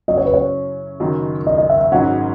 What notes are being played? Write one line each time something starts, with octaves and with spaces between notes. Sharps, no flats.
F#2 C#3 F#3 C#4 E4 D#5
C#5
B4
C#5
F#1 F#2 D#3 F#3
D#5
D#5
E5
E5
G#1 G#2 F#3 C#4 F#5